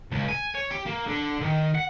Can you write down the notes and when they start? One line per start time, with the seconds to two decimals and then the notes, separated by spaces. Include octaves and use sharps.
0.12 C#2
0.29 G#5
0.55 C#5
0.71 G4
0.86 A#3
1.07 D3
1.42 D#3
1.75 F#5